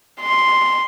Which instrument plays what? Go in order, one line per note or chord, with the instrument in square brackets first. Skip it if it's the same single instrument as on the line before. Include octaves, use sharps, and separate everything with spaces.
[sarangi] C6